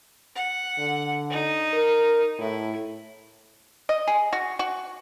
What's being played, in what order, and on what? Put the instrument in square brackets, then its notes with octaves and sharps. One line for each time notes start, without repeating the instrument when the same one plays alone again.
[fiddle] F#5
[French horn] D3
[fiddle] D#4
[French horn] A#4
[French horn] A2 [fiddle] E4
[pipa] D#5
G#4
F#4
F#4